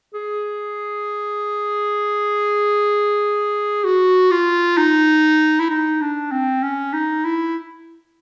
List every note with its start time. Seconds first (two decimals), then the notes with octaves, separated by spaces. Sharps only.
0.14 G#4
3.84 F#4
4.31 F4
4.78 D#4
5.60 E4
5.70 D#4
6.01 D4
6.32 C4
6.63 C#4
6.93 D#4
7.25 E4